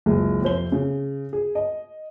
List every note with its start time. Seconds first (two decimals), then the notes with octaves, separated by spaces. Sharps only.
0.06 F#1 C#2 G#4
0.42 F2 C3 C5 G7
0.72 C#3
1.33 G#4
1.55 D#5